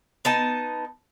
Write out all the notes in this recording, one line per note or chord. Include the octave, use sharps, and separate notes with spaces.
B3 D#4 A5